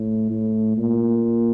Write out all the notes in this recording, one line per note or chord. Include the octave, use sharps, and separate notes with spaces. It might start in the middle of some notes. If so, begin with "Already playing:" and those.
Already playing: A2
A2
A#2